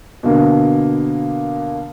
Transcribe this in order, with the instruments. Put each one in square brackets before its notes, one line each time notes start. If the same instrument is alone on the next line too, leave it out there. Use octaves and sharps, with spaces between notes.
[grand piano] B2 D3 A#3